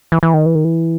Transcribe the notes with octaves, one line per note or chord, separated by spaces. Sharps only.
E3
E3
D#3
E3
D#3
E3